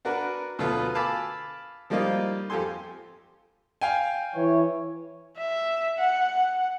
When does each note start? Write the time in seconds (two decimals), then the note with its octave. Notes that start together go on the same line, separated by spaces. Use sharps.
0.05 D4 F#4 A#4 B4
0.59 D2 B2 F#3 F4 A4 B4
0.95 F5 G#5 A5 B5 D6 E6
1.90 F3 G3 A#3 D#4 F4
2.50 F2 G4 A4 G#5 C6
3.81 F5 G5 G#5
4.35 E3 C#5
5.37 E5
5.99 F#5